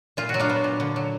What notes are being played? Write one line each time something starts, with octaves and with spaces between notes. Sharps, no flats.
A#2 F4
F#4
F#3
D4 F4
B3
A#2
D3
F#3